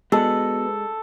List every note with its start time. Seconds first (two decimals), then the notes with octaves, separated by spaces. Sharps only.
0.12 G#3 B3 F#4 A4 B4